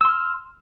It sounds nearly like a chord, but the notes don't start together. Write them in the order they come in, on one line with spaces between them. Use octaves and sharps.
E6 C6 F6